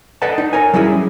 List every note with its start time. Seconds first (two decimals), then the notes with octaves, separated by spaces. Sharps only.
0.22 A4 B4 D5 D#5 F#5 A5
0.38 D#4
0.53 A#4 C#5 G#5
0.73 F#3 G3 C#4 E4 G#4